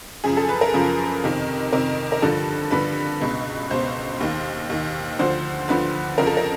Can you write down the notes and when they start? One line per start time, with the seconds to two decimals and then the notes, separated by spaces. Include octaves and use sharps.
0.24 F#2 C#3 F3 G#4
0.37 A4
0.49 B4
0.61 A#4
0.74 F#2 C#3 F3
1.24 F2 C3 D#3
1.73 F2 C3 D#3 A#4
2.12 A#4
2.22 G2 D3 F3 A4
2.71 G2 D3 F3 B4
3.21 C#2 B2
3.70 C#2 B2 C5
4.20 D#2 D#3
4.70 D#2 D#3
5.19 D2 D3 F3 C5
5.68 D2 D3 F3 B4
6.18 F2 C#3 F3 A#4
6.27 A4
6.37 A#4